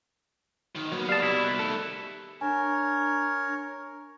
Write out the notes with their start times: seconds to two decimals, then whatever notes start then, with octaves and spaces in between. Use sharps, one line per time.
0.75 G#2 D#3
0.92 F#3 A#3 B3
1.09 G4 D5 F5 A5 D#6
1.22 C2 B2 E4
1.41 B5 F#6
1.59 D#3 A3 A4
2.41 D4 A#4 C#5 G#5